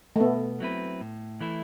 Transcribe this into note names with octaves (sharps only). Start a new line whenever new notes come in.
A3
B2 B3
F#3 C4 E4 B4
A2
E3 A3 E4